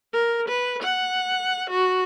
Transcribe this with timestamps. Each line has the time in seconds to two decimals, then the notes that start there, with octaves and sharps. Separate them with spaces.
0.13 A#4
0.48 B4
0.83 F#5
1.70 F#4